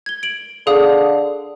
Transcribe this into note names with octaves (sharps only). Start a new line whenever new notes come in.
G#6 G7
D7 F#7
D3 G#4 F5 D#6